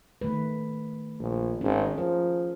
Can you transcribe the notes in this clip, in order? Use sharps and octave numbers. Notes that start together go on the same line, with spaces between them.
D#3 A3 B4
A#1
G#1 C#4 G#4
F3 A#4